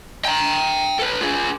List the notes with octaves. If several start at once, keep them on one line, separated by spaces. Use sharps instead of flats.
G5 A#5
A4 B4
F4 G#4